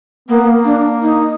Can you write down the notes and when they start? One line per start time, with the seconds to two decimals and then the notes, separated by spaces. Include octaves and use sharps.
0.28 A#3 B3
0.47 A#3
0.65 D4
1.01 D#4